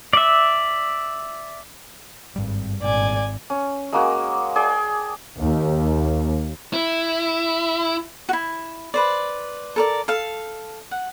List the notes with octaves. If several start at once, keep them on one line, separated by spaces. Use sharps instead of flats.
D5 E5
G#1 G2 G3
G#1 G2 A#2 D5 G#5
C#4
G#3 A#3 F#4
G#4 D5 G5 A5
D#2
E4
E4 F#4
B4 C5 D5
A4 A#4 D5
A4 F5
F#5